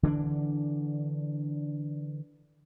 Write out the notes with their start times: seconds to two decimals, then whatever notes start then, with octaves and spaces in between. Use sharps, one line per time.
0.03 D3 E3 C#4 D4